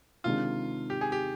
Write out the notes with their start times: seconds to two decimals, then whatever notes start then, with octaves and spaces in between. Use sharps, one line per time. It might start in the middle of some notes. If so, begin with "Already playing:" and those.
0.24 C3 D#3 G#3 D4 F4
0.90 G4
1.01 G#4
1.12 G4